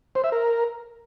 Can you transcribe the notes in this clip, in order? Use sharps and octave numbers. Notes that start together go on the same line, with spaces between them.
C5
E5
A#4